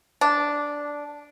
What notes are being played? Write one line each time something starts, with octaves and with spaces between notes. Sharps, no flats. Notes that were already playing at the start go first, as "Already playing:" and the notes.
D4